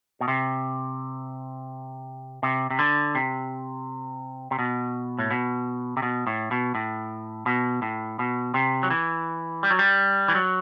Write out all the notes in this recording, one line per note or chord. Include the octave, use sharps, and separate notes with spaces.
B2
C3
C3
C3
D3
C3
C3
B2
A2
B2
C3
B2
A2
B2
A2
B2
A2
B2
C3
F#3
E3
G3
F#3
G3
E3
F#3